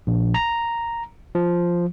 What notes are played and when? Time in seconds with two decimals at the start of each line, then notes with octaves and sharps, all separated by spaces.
0.07 A#1
0.34 A#5
1.35 F3